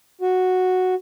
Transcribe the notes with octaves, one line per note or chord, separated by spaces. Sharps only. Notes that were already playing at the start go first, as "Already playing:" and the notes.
F#4